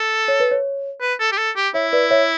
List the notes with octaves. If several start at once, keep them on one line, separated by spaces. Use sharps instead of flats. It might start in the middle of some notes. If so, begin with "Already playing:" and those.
Already playing: A4
C#5
B4
C#5
B4
A4
G4
A4
G4
E4 C#5 E5
B4 D5
C#5 E5